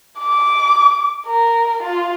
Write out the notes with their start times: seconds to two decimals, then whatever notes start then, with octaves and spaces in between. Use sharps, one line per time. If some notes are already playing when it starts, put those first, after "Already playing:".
0.19 D6
1.26 A#4
1.83 F4